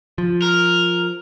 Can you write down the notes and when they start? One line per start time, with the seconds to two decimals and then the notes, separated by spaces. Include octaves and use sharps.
0.18 F3
0.42 A#4